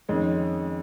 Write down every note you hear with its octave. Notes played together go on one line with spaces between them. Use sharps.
F2 D#3 G#3 C#4